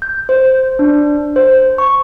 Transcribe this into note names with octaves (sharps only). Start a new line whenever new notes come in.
G6
C5
D4
C5
C#6